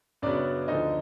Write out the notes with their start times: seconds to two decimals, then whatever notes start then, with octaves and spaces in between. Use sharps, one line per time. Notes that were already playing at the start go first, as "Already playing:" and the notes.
0.22 F#2 C#3 F#3 B3 D4 D5
0.68 D2 D3 F3 D#4 D#5